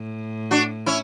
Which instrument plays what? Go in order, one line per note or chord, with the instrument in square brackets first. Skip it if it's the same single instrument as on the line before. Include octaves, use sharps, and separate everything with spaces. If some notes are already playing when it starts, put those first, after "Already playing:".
Already playing: [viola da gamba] A2
[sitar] D4 F#4
C#4 E4